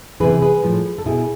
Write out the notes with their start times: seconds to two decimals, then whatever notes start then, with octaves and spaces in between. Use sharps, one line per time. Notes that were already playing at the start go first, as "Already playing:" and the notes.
0.20 C3 E3 G#4 B4
0.42 G#4 B4
0.63 A2 F3
0.98 A4
1.05 B2 E4 G#4